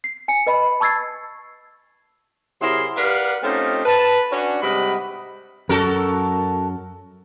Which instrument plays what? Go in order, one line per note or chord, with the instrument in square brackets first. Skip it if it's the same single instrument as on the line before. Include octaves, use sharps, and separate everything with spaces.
[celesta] C7
G#5 C#7
B4 D#5 B5
A5 C#6 E6 G#6 A6 C7
[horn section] C3 F#3 E4 G#4 A#4 C6
G4 A#4 B4 D5 F5 F#5
A3 C4 C#4 D#4 F4 G4
B4 A5
C#4 D4 F#4
G#2 C3 G3 D#5 F#5 B5
[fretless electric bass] F#2 [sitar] F#4 A4 A#4